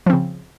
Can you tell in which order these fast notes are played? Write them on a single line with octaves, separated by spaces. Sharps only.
F3 C4 C#3